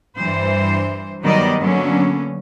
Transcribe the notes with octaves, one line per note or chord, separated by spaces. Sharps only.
G2 E3 C5
D#3 F#3 G3 B3 D5 D#5
D3 F#3 A#3 B3 C#4